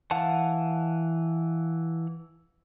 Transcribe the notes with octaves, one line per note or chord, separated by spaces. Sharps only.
E3 F5 F#5 A5